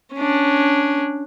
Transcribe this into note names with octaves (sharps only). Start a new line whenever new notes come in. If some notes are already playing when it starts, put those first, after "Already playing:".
C#4 D4